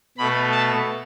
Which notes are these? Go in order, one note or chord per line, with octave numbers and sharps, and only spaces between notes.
B2 A3 B5
A5